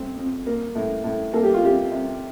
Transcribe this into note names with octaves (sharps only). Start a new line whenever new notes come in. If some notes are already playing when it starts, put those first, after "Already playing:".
Already playing: A3 C4
F2
A#3
A2
A2
A#3 A4
G4
F4
C3 G4
C3